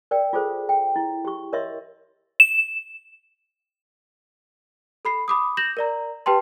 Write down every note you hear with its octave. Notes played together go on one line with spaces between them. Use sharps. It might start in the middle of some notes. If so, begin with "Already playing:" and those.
A#4 D5 G5
F4 G#4 A4 C5
G5
E4
G4 C#6
A#4 C#5 D#5 E5 C6
E7
A4 B5 C7
B5 D6 D#6
G6 A#6 E7 F#7
A#4 D5 A#5
G4 B4 G5 A5 C6